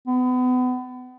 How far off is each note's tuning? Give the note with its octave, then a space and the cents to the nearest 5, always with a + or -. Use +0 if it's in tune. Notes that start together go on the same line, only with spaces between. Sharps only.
B3 +30